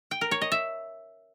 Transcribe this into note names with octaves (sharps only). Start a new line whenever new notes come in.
G5
A#4
C#5
D#5
E5